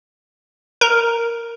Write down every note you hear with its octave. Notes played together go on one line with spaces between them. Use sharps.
A#4